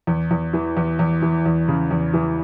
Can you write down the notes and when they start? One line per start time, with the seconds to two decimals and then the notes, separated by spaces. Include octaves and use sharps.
0.07 E2
0.31 E2
0.53 E3
0.77 E2
0.99 E2
1.22 E3
1.46 E2
1.68 C#3
1.91 E2
2.14 E3